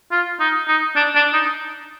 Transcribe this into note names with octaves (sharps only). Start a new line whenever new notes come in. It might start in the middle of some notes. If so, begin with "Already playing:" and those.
F4
D#4
D#4
D4
D4
D#4